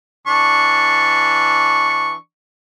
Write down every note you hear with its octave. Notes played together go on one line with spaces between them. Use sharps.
E3 D4 C#6